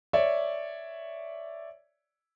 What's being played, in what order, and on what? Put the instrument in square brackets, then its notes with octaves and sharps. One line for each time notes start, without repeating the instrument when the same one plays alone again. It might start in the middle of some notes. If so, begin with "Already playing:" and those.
[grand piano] C#5 D5 E5